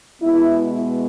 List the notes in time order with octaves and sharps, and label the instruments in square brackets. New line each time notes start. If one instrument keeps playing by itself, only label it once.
[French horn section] B2 G#3 B3 E4